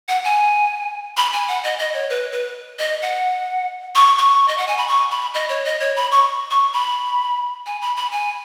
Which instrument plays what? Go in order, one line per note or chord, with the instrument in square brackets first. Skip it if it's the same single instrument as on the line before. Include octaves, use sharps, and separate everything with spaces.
[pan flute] F#5
G#5
B5
G#5
F#5
D#5
D#5
C#5
B4
B4
D#5
F#5
C#6
C#6
D#5
F#5
G#5
B5
C#6
B5
D#5
C#5
D#5
C#5
B5
C#6
C#6
B5
G#5
B5
B5
G#5